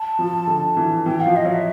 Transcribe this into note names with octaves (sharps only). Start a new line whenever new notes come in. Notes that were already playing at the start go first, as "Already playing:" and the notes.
Already playing: A5
F3
D3
E3
E3 G5
F5
F3
D#5
F#3
E5